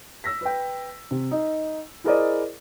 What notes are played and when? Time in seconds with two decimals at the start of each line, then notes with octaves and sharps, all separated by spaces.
0.24 E6 A#6 B6
0.41 B4 G5
1.11 C3
1.31 D#4
2.04 E4 G#4 A#4 C5 D5 D#5